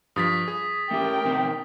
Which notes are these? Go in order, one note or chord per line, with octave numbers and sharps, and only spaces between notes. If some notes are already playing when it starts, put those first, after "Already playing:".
G2 F3 D#6 A6 B6
G#4
A3 C#4 G4 A#4 G5
B2 D#3 C4